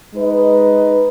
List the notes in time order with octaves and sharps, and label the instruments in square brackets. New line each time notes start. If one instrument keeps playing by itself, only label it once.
[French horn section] G#3 D#4 B4 D#5